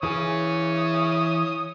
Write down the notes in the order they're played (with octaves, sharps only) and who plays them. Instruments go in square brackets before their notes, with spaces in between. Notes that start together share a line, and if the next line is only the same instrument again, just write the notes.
[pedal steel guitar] E3 G#4 G#5 [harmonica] C#5 D#6